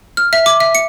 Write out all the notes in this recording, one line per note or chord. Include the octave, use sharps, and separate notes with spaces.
F6
E5
D6
E5
C#7